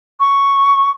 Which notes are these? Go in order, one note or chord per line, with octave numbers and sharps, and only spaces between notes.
C#6